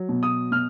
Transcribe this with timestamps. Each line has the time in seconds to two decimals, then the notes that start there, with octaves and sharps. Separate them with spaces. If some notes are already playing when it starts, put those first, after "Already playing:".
Already playing: F#3
0.09 B2
0.23 D#6
0.52 B2 F6